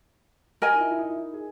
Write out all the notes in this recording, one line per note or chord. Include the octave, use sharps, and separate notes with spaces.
A#4 D#5 G#5
D#4
E4
E4
D#4
E4
D#4
G#4